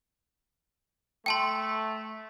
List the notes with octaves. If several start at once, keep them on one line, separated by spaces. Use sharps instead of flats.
A3 G5 A5 C6